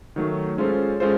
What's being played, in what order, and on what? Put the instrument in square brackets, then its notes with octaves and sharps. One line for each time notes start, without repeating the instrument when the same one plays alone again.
[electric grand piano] D#3 F#3 A3
G#3 C#4 F4 A4 C5
G#3 C#4 F4 A4 C5